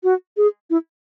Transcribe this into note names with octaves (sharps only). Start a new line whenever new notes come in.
F#4
G#4
E4